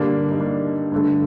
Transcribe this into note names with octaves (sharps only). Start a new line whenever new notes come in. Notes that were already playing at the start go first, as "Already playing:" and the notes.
Already playing: G2 D3 G3 A#3 D4
D#4
A#3 D4
G2 D3 A3